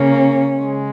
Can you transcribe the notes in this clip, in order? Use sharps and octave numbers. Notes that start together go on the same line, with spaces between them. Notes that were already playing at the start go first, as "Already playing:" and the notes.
Already playing: C#3 A#3 C#4
C#3 G#3